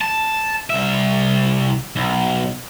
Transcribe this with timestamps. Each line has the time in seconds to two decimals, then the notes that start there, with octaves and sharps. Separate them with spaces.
0.01 A5
0.70 C2 E5
1.96 B1